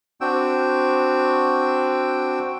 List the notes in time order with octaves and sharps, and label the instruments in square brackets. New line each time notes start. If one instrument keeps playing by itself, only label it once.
[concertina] C4 D4 F#4 G5 E6